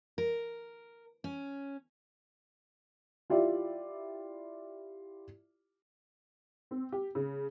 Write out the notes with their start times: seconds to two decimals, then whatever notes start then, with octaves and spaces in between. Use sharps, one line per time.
0.18 A#4
1.24 C#4
3.30 E4 F4 G4 D5 E5
6.71 C4
6.92 G4
7.15 C#3